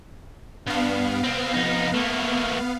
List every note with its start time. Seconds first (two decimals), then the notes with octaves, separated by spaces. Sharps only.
0.67 G2 B3 F5
1.24 C2 C4
1.53 F2 D#4
1.94 A3 A#3